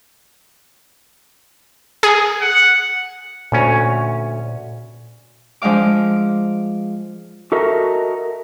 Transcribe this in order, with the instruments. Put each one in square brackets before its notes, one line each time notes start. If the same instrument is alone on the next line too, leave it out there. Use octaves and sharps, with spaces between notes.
[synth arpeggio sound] G#4
[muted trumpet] F#5
[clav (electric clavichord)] D2 C#4 [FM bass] A#2
[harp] F3 G#3 D4 F5 D6
[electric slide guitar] F#4 A4 A#4 D#5 E5